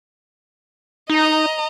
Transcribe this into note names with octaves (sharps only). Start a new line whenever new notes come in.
D#4 D#5 A#5